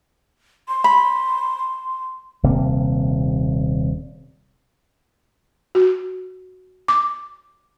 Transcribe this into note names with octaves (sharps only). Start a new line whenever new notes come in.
C6
B5
D#1 C3 A#3
F#4
D6